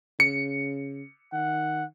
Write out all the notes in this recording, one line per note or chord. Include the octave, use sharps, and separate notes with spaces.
C#3 C#7
D#3 F#5